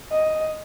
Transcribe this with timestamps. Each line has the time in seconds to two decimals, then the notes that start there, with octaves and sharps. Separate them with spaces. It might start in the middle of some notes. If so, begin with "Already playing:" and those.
0.11 D#5